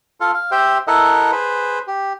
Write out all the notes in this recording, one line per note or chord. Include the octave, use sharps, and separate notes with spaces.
F4 A4 F5
F5
G4 C5 E5 G5
E4 A4 A#4 D#5 E5 F#5
G#4 B4 C5
G4